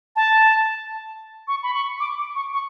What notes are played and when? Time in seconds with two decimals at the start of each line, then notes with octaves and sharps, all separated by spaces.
0.16 A5
1.48 C#6
1.63 B5
1.74 C#6
2.00 D6
2.18 D6
2.35 C#6
2.53 C#6